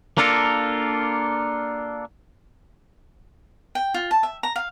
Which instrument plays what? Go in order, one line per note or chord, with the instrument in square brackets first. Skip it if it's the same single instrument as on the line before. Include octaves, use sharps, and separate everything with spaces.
[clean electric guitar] A#3 D4 F4 A4 A#4
[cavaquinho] G5
F4
A5
E5
A#5
F5